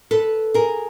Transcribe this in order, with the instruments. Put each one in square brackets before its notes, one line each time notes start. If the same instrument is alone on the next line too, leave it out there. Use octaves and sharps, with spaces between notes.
[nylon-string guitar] A4 B4
G#4 A#4